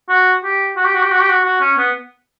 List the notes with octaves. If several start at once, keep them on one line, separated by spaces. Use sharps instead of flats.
F#4
G4
F#4
G4
F#4
G4
F#4
G4
F#4
F#4
C#4
B3